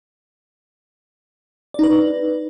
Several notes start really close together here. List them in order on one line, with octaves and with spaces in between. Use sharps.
D5 D#4 B4